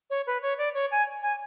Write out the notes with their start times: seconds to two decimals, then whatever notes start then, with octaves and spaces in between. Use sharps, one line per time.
0.10 C#5
0.27 B4
0.42 C#5
0.58 D5
0.74 C#5
0.91 G#5
1.23 G#5